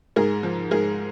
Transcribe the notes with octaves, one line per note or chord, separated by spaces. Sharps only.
G#2 G#4 A#4
F3
G#2 G#4 A#4